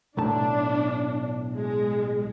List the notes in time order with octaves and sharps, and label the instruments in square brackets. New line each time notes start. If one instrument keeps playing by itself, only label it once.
[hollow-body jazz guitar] B1 A2 A5 [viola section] D4
[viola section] G#3